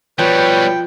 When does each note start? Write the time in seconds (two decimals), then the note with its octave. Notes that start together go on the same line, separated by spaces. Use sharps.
0.19 B2 F3 G3 B4 C#5 G5